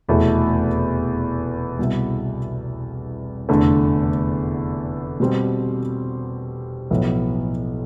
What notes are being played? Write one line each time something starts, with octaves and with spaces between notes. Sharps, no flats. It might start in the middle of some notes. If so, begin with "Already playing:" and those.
F1 E2 B2 A3 E4
C2 B2 B3 E4
F1 E2 D3 A3
B2 G3 C4 G4
B1 A2 F3 B3 E4